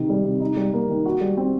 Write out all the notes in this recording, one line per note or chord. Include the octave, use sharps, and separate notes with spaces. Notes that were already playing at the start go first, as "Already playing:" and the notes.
Already playing: C3 D#3
G3
C3
D#4
G3
A#3
D#3
F#4
G3
C4